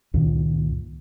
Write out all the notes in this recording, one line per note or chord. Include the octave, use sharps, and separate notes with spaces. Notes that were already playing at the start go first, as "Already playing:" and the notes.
C#2 G2 A#2 D#3